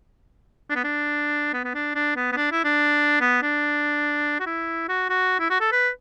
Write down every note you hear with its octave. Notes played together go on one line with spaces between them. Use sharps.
D4
B3
D4
B3
B3
D4
D4
B3
B3
D4
E4
D4
B3
D4
F#4
E4
F#4
F#4
E4
F#4
A4
B4